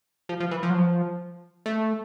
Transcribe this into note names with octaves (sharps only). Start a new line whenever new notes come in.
F3
F3
E3
F3
F#3
F3
A3